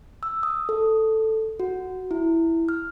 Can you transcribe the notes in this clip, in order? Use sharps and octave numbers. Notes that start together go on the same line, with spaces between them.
E6
D#6
A4
F#4
E4
F6